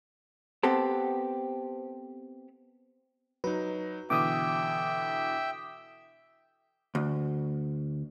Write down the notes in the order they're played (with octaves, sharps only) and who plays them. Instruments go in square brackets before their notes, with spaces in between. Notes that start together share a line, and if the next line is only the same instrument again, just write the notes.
[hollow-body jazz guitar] B3 C4 G4 A4
[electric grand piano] F#3 D#4 [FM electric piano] B4
[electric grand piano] B2 D3 E3 [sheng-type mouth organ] E5 G5 [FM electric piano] D6 D#6
[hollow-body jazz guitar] D2